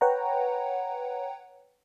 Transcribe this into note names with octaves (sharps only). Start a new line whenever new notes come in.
B4 C#5 F#5 G5 A#5